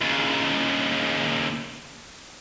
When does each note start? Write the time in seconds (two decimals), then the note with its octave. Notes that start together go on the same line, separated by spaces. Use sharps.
0.01 D#2 C#3